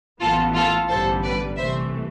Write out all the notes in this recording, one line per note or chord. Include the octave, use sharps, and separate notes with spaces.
A1 A2 E3 B3 F4 A4
F4 A4
A1 G2 D3 G3 B3 A4 C5
B4 D5
C2 C3 E3 A3 C5 E5